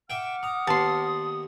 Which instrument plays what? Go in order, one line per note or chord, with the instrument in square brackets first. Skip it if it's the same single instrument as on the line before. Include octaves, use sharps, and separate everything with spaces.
[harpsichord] E5 G5 [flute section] F#5 D6 F6
[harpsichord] A#5 [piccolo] D#6
[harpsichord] D#2 B3 [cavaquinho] A5 C6